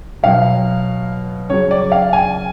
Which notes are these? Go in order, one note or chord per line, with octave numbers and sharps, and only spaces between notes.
B2 F#3 F5
C#3 F#3 C#5
D5
F5
G#5